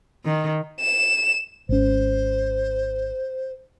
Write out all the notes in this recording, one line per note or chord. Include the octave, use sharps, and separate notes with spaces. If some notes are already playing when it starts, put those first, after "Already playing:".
D#3
E7
G#1 C#4 C5